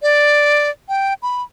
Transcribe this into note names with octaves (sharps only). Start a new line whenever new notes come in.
D5
G5
B5